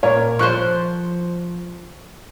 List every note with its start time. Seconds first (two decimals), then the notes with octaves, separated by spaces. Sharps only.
0.03 A#2 A#4 C#5
0.39 F3 C5 C#6 F#6